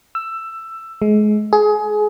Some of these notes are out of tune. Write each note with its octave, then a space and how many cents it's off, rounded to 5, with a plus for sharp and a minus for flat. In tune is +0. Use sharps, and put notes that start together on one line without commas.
E6 +15
G#3 +30
G#4 +25